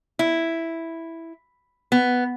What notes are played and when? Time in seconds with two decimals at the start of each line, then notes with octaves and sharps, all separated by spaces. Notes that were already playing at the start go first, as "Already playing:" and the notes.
0.19 E4
1.92 B3